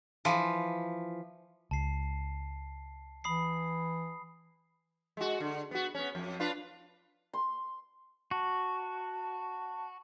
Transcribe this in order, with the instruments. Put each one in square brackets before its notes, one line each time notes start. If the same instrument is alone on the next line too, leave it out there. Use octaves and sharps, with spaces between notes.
[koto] E3 F3
[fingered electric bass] C#2 [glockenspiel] A5 C7
[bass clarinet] E3 [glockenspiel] B5 D#6 C7
[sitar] G#3 F#4
D3
B3 F#4
B3 C#4
F2
D4 F4 B4
[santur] C6
[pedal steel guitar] F#4 [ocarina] A5